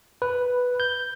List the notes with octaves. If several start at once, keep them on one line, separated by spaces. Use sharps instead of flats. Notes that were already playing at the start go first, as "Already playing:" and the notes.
B4
G6